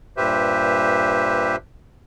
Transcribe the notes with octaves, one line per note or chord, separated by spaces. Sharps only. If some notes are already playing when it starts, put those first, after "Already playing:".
G2 A#2 G4 B4 C5 E5